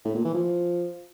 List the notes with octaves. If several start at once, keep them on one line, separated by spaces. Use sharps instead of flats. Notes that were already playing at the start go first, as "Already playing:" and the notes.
A2
A#2
E3
F3